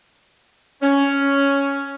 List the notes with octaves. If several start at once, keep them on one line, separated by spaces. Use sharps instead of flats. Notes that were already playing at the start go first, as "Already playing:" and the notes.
C#4